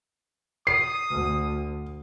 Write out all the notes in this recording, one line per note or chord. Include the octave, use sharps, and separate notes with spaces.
D#6 C7
D2